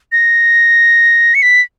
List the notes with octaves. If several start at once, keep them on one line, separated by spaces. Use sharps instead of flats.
A#6
C#7
B6